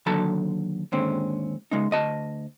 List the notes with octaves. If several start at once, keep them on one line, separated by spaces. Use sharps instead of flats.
D#2 D3 F#3 A4 A5 A#5
D#2 G#2 D3 C4 C#4
C#3 G#3 C#4 D#4
D2 D#5 A5